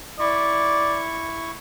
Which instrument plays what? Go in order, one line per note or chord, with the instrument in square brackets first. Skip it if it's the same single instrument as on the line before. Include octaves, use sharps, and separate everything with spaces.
[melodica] E4 C#6 [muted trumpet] D5